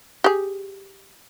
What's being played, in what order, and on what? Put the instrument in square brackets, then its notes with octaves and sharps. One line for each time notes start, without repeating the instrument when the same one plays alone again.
[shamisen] G4 G#4